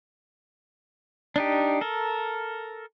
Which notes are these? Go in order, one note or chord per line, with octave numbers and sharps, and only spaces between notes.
D4 D#4 G4
A4 A#4